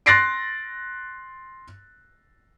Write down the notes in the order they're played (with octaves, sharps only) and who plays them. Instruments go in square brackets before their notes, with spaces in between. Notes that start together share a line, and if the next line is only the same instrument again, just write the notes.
[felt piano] C6 F#6 A6 A#6 C7 D7